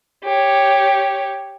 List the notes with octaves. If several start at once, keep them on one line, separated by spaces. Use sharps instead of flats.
G4 C#5